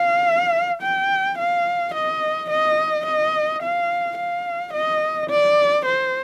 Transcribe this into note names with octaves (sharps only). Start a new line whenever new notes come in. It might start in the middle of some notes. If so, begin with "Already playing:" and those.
Already playing: F5
G5
F5
D#5
D#5
D#5
F5
F5
D#5
D5
C5